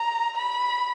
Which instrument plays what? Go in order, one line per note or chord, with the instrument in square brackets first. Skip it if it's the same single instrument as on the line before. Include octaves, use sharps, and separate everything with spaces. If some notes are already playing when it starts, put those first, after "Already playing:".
Already playing: [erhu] A#5
B5